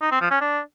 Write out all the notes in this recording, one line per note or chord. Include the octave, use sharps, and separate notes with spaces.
D#4
C4
F3
C#4
D4